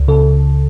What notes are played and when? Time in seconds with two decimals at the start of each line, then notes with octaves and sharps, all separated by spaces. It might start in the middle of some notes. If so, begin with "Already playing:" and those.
Already playing: C#2
0.08 C#3 A4